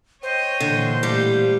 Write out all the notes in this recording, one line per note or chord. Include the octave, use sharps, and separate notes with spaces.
C5 C#5 D#5 G5
A#2 D3 E3
A2 G3 F5